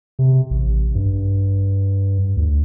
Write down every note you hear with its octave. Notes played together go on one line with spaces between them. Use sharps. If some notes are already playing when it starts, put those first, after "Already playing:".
C3
A1
G2
D2